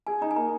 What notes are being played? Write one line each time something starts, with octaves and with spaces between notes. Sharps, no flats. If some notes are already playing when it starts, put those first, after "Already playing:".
G#4 G#5
D#4 A#5
G#5
A#3 A#5